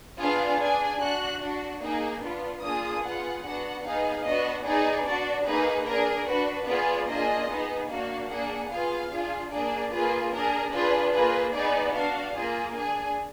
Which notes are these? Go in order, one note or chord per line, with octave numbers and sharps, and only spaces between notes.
B3 D4 F4 G#4 F5
D4 G#4 G#5
D4 F#4 F#6
D4 F#4
A#3 D#4 G#4
B3 D4 F4
A#3 D4 F4 G#4 D#6
B3 F4 G#4 F#5
B3 D4 F#4 F#5
B3 D#4 G#4 F5
B3 D4 F#4 D#5
B3 D#4 G#4 D5
D4 F#4 D5
A#3 D#4 G#4 B4
D4 G#4 A#4
D4 F#4 B4
B3 F4 G#4 D5
A#3 D4 F4 G#4 D#5
B3 D#4 G#4
A#3 D4 F#4 F5
A#3 D4 G#4 F#5
B3 F4 G#4 F5
D4 F4 G#4
A#3 D4 G#4 D5
A#3 F4 G#4 B4
D4 G#4 A#4
D4 F4 G#4 B4
A#3 F4 G#4 B4
B3 D#4 G#4 D5
D4 F#4 F5
A#3 F4 G#4
D4 G#4 G#5